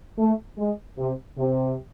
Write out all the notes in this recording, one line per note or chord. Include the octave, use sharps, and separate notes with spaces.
A3
G#3
C3
C3